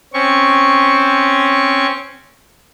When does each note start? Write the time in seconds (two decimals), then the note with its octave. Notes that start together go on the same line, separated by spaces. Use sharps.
0.13 C4 C#4 C#6